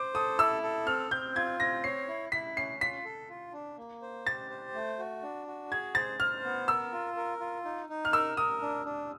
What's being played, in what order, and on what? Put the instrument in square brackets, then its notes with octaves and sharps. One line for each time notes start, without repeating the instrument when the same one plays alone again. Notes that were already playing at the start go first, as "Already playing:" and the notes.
Already playing: [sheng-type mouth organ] C5 [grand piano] D6
[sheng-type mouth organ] A4 [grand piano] D#6
[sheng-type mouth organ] E4 [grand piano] E6
[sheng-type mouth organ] A4
[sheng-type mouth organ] C4 [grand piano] F6
[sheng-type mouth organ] C4 [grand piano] G6
[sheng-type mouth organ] F4 [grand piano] G#6
[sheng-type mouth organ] C4 [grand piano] A#6
[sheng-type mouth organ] C#5 [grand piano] C7
[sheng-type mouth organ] E4
[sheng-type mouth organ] E4 [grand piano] B6
[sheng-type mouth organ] C#4 [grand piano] C7
[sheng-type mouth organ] F4 [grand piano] B6
[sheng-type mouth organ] A4
F4
D4
A#3
C5
[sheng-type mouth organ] G4 [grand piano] A6
[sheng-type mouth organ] C5
A3
F#4
D4
F#4
[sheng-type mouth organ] G#4 [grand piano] G#6
[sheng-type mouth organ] C5 [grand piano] A6
[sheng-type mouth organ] C5 [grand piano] F6
[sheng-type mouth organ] B3
[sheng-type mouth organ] A#4 [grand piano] E6
[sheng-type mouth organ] F4
A#4
F4
D#4
D#4
[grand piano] F6
[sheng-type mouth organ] A#4 [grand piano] E6
[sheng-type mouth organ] A#4 [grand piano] D#6
[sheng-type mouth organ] D4
D4